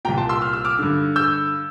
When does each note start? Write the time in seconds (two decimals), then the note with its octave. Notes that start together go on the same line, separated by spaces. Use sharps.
0.05 A#2 G5 A#5
0.08 C2
0.17 A5 C6
0.29 C6 E6
0.42 F6
0.53 E6
0.65 D6 F6
0.79 G2 D3
1.16 E6 G6